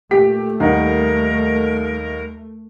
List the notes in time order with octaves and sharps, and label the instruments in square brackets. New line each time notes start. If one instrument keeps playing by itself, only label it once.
[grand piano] A#2 B6 [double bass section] A3 [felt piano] G4
[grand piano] D#2 G3 F#5 [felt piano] D#4 [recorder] A#4